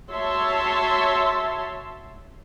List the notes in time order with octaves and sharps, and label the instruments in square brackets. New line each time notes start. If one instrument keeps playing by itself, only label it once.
[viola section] F#4 C#5 E5 A5 C6